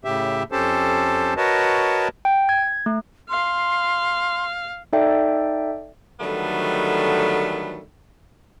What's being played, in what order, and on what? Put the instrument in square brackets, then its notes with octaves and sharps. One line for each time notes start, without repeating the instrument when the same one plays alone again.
[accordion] A2 C#3 G4 E5
F2 C#4 G4 A4 C5 A5
F#4 A#4 B4 C#5 D#5 A5
[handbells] G5
G#6
A3
[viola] F5 [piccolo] C6
[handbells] D#4 A4 D5 E5 G5
[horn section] D3 D#3 F#3 G3 A3 B3